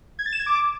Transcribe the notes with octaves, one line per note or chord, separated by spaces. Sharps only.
G#6
A6
E7
G#6
D6